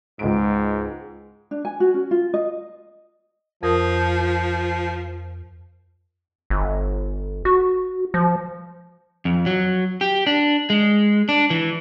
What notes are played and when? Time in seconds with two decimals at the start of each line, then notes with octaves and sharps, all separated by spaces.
0.19 C#2 G#2 D7
1.51 D4
1.65 G#5
1.80 F#4
1.94 C#4
2.11 F4
2.34 D#5
3.63 F2 F3 A#4 D#6
6.50 G1
7.45 F#4
8.14 F3
9.25 F2
9.46 F#3
10.01 G4
10.27 D4
10.70 G#3
11.29 D4
11.50 E3